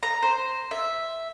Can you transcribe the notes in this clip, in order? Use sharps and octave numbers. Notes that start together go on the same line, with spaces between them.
A#5
C5
E5